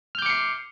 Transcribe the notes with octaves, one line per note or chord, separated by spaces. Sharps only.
D6 F6 G6 C7 C#7